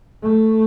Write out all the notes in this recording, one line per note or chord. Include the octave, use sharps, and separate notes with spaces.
A3